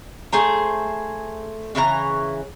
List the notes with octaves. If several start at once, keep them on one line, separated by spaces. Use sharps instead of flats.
A3 G#4 C5 A#5
C#3 E3 F4 A#5